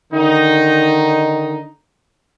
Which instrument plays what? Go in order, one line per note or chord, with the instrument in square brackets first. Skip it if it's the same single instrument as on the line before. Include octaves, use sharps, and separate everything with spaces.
[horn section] D3 D#3 D#4